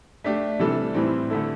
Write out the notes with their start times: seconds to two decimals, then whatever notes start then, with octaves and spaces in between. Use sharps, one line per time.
0.24 A3 D4 G4
0.59 C3 E3 G3 D4 A4
0.94 A2 E3 G3 C4
1.30 D3 A3 E4 A4